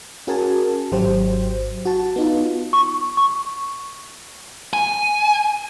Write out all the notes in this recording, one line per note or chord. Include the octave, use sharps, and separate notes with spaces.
C#4 F#4 G#4 A#4 G#5 A5
G#1 F#3 G4 C5
F#4 A5
B3 D#4 F4
C#6
C#6
G#5